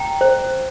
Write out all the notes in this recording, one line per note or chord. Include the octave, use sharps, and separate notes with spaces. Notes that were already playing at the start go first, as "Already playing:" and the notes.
Already playing: G5 A#5
C5